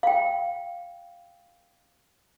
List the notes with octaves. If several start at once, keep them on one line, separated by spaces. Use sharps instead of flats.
F5 G5